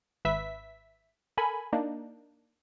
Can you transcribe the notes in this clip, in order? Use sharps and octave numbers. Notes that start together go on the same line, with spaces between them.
G#1 B4 E5 B6
A4 A#4 G#5 B5
A#3 D4 D#4